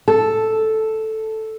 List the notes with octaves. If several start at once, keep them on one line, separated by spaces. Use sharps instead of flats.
A4